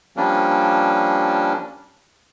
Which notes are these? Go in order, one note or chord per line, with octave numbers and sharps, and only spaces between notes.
F3 G3 A#3 C#4 D4